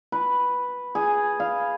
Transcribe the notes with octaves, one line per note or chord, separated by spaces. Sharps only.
B4
G#4
F5